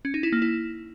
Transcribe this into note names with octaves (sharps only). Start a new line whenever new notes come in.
C#4
D#4
E4
A#3
E4